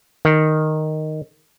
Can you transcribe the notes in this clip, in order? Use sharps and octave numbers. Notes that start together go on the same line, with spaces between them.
D#3